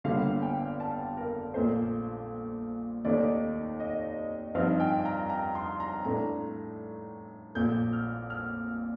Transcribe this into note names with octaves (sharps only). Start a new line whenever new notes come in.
G1 G2 D3 G3 A#3 F5
G5
A5
A#4
A#1 A#2 A3 C5
D#2 D#3 A3 D#4 D5
D#5
G2 F3 C4 D#4 F5
G5
A#5
A#5
C6
A#5
A2 A3 D4 A#5
A#1 A#2 A3 G6
F6
F6